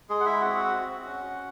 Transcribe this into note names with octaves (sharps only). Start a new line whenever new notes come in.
G#3 G#4
F#5
E4 E5
C4 F#4 F#5
F#4
C#4